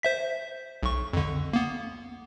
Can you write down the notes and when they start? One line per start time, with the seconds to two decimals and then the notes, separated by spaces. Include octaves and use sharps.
0.03 C5 E5 B6
0.83 B1 C#6
1.13 F2 D3
1.53 A#3 B3